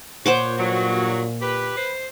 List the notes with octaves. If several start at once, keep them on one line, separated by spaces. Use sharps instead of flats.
A#2 C5 C#5 F#5 D6
G2 F#3 F#4
G4 B4
C5